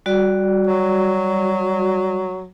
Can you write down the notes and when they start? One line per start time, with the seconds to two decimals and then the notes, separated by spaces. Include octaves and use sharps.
0.06 G3 F#4 D5
0.67 F#3